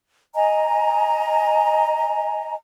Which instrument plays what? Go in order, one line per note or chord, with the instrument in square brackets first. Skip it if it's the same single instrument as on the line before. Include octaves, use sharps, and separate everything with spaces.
[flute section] D#5 G#5 A#5